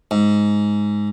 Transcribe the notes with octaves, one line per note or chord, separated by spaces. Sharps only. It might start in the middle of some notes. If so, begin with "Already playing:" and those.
G#2